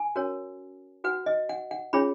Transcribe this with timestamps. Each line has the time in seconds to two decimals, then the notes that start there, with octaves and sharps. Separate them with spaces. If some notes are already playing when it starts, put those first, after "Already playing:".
Already playing: G#5
0.16 C#4 F#4 A#4 C#5
1.04 F#4 B4 F#5
1.26 D#5
1.49 F#5
1.71 F#5
1.93 C#4 F4 G#4 C#5 B5